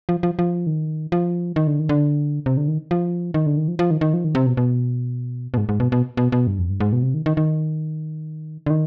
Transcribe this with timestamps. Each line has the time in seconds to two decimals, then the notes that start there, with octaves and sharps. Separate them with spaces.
0.09 F3
0.23 F3
0.39 F3
0.67 D#3
1.12 F3
1.56 D#3
1.67 D3
1.79 D#3
1.89 D3
2.46 C3
2.57 D3
2.68 D#3
2.91 F3
3.34 D#3
3.46 D3
3.57 D#3
3.68 F3
3.79 F3
3.91 D#3
4.01 D#3
4.14 F3
4.24 D#3
4.35 C3
4.46 B2
4.57 B2
5.54 B2
5.57 G#2
5.69 G#2
5.80 B2
5.92 B2
6.17 B2
6.32 B2
6.47 G2
6.59 F2
6.70 G2
6.80 G#2
6.93 B2
7.03 C3
7.14 D#3
7.26 D#3
7.37 D#3
8.66 D3
8.70 D#3